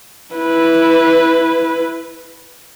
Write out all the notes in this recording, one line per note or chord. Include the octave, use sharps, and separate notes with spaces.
E4 B4